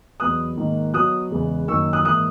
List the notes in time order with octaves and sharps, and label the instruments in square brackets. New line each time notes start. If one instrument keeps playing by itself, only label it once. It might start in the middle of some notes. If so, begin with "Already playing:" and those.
[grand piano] E2 B2 F#3 B3 D#6 F#6
G#2 D#3 A#3
B2 F#3 B3 D#6 F#6
E2 C#3 G#3 B3
F#2 D#3 A#3 C#6 E6
D#6 F#6
G#2 E3 A#3 D#6 F#6